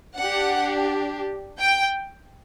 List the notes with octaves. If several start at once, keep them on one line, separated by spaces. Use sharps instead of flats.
D4 G4 F#5
G5